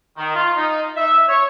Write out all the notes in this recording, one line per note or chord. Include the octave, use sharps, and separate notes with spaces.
D#3
F4
D#4
E5
C#5